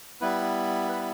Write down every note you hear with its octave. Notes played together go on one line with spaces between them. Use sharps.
G3 B3 E4 B4
B4